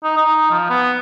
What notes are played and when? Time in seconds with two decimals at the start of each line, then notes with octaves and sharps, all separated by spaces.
0.04 D#4
0.17 D#4
0.51 F3
0.70 B3